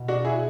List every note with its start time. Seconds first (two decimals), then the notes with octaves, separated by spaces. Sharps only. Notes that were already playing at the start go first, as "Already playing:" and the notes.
Already playing: E2 B2
0.08 D4 F#4
0.25 E4 G#4